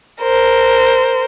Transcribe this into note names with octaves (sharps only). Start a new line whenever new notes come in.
A#4 C5